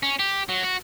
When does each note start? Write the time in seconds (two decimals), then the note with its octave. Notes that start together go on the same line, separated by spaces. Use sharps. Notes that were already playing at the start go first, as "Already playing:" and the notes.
0.03 C#4
0.19 G4
0.49 F#3
0.63 F#4